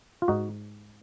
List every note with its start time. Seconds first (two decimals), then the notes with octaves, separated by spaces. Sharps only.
0.22 F4
0.28 G#2 D#4 F#4